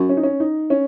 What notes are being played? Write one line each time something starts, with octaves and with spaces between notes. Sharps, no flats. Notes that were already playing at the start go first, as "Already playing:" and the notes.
Already playing: F#2
C#4
D#4
C#4
D#4
C#4